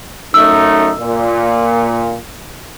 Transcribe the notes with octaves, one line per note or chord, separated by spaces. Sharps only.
F#2 A3 D#4 E6
A#2